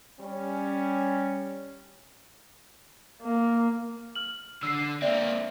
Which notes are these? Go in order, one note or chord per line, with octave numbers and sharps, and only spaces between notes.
G3 C#4
A#3
F6 F#7
D3 E6 C7
A#3 C4 D5 E5